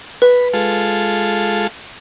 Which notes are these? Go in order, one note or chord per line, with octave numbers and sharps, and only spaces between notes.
B4 B5
G#3 F4 A4